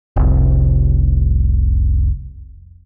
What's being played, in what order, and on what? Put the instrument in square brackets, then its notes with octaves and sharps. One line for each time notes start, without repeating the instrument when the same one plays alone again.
[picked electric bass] F1 C2